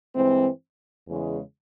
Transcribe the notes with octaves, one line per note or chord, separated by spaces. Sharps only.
G2 E3 G#3 C4
E2 C#3 E3 G#3